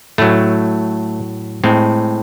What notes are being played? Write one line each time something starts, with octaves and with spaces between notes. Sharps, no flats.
A2 F#3 A3
A2 G#3 C4